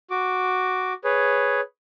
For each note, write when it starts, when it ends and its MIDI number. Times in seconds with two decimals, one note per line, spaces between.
0.11 0.93 66
0.11 0.93 86
1.04 1.61 68
1.04 1.61 71
1.04 1.61 73